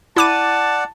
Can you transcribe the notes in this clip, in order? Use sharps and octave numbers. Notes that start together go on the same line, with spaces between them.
E4 D5 F#5 A5 D6 D#7